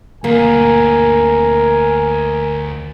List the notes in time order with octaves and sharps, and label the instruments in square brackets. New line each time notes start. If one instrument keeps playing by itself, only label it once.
[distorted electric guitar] D2 G#4 [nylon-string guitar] A#3 [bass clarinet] A#4 [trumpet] G#5